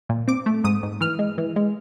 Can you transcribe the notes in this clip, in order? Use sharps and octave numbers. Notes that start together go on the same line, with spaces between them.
A#2
C4 D6
A3
G#2 D#6
G#2
E3 F6
G#3
E3
G#3